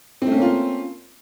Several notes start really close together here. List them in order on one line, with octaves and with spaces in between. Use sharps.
C4 A3 C#4 A#3 F4